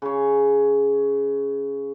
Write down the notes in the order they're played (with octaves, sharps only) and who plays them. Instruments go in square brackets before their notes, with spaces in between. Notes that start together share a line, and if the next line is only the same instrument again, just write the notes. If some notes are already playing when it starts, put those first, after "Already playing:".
[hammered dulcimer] C#3 C#5